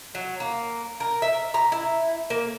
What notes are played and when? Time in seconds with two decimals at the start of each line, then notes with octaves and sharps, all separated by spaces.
0.15 F#3
0.40 A#3
1.00 A#4
1.22 E5
1.54 A#5
1.72 E4
2.30 A#3